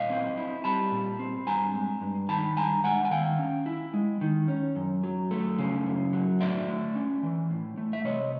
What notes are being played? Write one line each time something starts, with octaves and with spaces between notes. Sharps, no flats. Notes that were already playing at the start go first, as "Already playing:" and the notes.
Already playing: A#2 D#5 F5
C4
E4
G3 A5 B5
A#2
C4
G2 G#5 A#5
G#3
G2
D#3 A5 B5
G2 G#5 A#5
G#3 F#5 G#5
G#5
D#3 F5 G5
C#4
E4
G#3
D#3
C#4
F#2
F#3
A3
C#3
F#2
F#3
A2 D5 E5
A3
C#4
E3
A2
A3
E5
C3 C#5 D#5